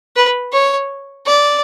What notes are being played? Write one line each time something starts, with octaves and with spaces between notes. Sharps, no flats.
B4
C#5
D5